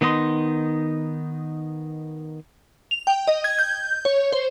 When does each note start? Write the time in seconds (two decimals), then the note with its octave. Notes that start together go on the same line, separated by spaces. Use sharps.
0.01 D#3 B3 D#4 D#5 C6
2.91 F7
3.07 G5
3.28 D#5
3.44 G#6
3.59 G6
4.05 C#5
4.32 C5